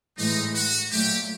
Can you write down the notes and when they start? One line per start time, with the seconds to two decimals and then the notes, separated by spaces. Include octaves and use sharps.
0.17 A2 E3 G#3 D#4
0.54 F#4
0.91 A#2 F#3 A3 G4